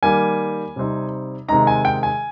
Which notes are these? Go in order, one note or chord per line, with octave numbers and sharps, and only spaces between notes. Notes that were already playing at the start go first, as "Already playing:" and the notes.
D#3 G3 A#3 G#5
C3 G3 C4 D#4
C3 D#3 G#3 D#4 A#5
G#5
G5
G#5